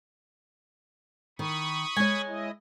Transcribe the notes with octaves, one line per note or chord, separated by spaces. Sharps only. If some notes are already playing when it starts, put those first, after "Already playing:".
D#3 B5 C#6 D#6
G#3 C#5 G#5
E4 D#5